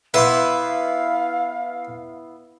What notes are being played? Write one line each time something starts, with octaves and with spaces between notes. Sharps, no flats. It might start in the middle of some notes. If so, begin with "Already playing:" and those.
B3 E4 B4 F5 C6 D6